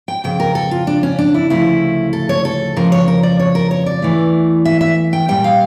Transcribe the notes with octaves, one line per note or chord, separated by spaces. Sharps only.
G5
F2 C#3 G5
A#4
A4
F4
D4
C#4
D4
E4
D2 C#3 F3 A3 E4
A4
C#5
A4
F2 C#3 F3 A#4
C#5
A#4
D5
C#5
A#4
C#5
D5
E2 E3 A3
E5
E5
G5
A#2 G3 G5
F5